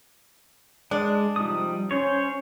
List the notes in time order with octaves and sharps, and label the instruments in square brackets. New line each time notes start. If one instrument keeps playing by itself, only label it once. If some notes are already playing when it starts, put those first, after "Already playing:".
[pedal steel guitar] G#3 [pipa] D4
[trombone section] C3 F3 D#4 [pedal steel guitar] G3 D#6
[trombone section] C#4 [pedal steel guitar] C5 C#5